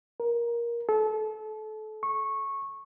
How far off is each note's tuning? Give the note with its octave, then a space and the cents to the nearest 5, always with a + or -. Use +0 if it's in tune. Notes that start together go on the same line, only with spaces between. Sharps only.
A#4 +15
A4 -30
C#6 -15